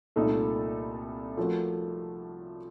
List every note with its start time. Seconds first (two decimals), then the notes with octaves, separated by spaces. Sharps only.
0.16 C2 A#2 A3 D#4 A4
1.37 F3 A3 C#4 F#4 A#4